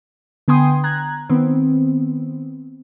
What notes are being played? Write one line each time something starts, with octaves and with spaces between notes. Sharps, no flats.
D3 B3 G5 G#5 C6 D#6
A#5 F#6 G#6
D#3 B3 C4